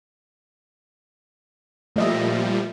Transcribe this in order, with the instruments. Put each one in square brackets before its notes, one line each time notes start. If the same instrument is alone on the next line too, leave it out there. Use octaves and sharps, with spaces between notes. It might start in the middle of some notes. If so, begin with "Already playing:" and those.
[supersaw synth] A#2 F3 G3 [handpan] A3 D#5 E5